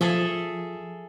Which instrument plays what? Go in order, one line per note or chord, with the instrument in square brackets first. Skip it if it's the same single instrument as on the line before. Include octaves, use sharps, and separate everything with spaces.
[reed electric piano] F3 [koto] G#4 A4 E5